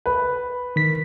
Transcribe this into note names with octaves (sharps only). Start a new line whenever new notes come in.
B4
D#3 B6